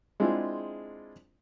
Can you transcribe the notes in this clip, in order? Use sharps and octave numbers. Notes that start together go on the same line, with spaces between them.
G#3 C4 D4 E4 F4 G#4